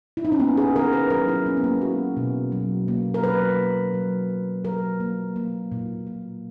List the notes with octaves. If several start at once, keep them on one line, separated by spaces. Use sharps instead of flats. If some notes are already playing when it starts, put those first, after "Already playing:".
E4
D#4
C#4
A#3 B3
G#4
D#3 A#4
B4
F#3 A#4
E4
A#3 C#4
B3
A#3
G#3 F#4
B2
F#3
A#3
A#4
F#3 B4
A#3
F#3
A#3
F#3 A#4
A#3
A#3
A#2
A#3